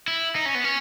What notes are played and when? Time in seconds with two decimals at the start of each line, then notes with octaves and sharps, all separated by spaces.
0.08 E4
0.36 D#4
0.46 C#4
0.55 B3
0.64 C#4